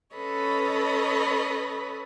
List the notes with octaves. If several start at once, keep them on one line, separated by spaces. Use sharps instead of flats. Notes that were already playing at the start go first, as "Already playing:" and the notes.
C#4 A4 B4 C#5 D#5 B5